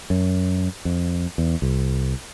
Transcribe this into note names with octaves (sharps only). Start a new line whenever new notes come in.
F#2
F2
E2
C2